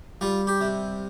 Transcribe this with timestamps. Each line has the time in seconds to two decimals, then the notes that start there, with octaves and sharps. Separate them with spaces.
0.21 G3 F4
0.47 G4
0.61 C3